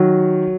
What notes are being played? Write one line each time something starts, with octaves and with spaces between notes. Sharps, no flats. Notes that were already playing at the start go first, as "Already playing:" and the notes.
Already playing: D#3 F#3